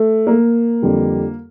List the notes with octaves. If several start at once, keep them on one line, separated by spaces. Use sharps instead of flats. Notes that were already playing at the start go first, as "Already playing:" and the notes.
Already playing: A3
A#3
F2 D3 G3